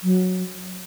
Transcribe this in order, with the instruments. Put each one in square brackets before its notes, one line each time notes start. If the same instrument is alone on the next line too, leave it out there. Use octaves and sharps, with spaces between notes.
[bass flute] F#3